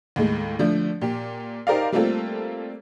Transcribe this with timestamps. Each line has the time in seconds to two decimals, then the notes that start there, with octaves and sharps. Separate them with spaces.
0.16 D#2 A2 G#3
0.59 D3 F3 A3 D4
1.01 A#2 G4
1.67 D#4 G4 A#4 C5 D5 F5
1.92 G3 A3 A#3 C4 F4 A4